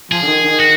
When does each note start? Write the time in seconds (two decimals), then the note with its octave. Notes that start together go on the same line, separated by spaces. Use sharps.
0.11 F3 G#4
0.22 D3
0.27 D#3
0.44 D#3
0.60 F#4